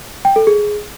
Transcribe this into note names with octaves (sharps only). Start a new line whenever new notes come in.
G5
A4
G#4